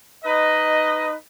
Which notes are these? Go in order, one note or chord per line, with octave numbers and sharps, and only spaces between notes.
D#4 B4 D#5